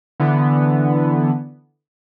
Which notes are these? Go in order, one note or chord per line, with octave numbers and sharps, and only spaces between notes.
D3 E3 B3